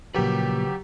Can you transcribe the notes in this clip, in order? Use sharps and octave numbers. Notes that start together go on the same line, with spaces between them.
A#2 C#3 F3 F#3 G4 A#4 B4